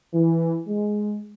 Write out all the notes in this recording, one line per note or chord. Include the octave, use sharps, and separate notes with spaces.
E3
G#3